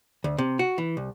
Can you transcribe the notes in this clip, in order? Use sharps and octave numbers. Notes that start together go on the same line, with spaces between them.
D2
C3
F#4
E3
C2